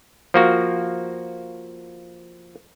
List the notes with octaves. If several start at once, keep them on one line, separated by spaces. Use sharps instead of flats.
F3 A#3 F#4